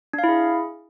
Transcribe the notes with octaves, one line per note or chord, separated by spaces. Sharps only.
D4
F5
E4
G#4